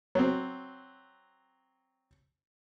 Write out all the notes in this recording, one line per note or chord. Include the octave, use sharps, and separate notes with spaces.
F#3 C4